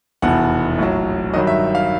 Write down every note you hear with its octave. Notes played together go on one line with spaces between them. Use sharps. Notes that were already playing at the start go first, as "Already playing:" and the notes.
F1 E2 B2 F#5
A#1 A2 F#3
G2 D#3 F#3 D#5
E5
F5